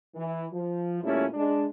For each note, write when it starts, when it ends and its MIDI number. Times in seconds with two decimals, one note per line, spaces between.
0.16 0.46 52
0.53 1.00 53
1.03 1.25 40
1.03 1.25 46
1.03 1.25 55
1.03 1.25 57
1.03 1.25 61
1.03 1.25 64
1.34 1.66 56
1.34 1.66 62